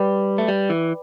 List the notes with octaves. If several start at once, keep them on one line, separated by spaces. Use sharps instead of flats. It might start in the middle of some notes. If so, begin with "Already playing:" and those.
Already playing: G3 B4 D5 G5 B5 D6
A3
G3
E3